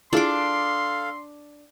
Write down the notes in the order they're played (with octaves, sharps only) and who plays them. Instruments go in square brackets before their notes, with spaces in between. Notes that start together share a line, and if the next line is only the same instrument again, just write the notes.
[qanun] D4 D6 [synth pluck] E4 F4 G#4 [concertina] A4 F5 [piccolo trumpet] C6